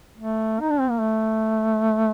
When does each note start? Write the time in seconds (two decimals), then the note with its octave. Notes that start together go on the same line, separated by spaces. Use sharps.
0.17 A3
0.60 D#4
0.70 D4
0.80 C4
0.90 A#3
1.00 A3